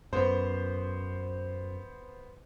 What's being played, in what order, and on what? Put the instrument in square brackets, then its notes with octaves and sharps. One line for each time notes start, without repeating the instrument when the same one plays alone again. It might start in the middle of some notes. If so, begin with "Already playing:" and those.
[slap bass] F#2 [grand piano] B3 C5